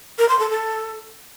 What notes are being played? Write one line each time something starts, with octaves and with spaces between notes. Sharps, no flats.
A#4
C6
A4
A4